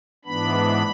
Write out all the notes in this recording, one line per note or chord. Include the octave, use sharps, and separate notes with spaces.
G#2 E3 B3 D4 B5